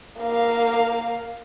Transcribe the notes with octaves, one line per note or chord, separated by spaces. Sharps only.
A#3 F5